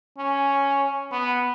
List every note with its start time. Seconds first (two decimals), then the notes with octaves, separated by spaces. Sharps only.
0.18 C#4
1.12 B3